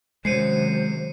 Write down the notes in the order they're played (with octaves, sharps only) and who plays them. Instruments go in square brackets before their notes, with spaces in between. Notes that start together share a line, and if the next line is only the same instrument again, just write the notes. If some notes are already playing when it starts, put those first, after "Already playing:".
[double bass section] F#2 C3 D#3 [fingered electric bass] G#3 [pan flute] C5 [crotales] C7 C#7 D#7